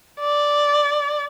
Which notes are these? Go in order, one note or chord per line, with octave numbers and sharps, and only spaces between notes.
D5